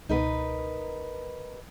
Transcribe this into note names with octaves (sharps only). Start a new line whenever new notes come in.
C#2 B2 D#4 A#4 B4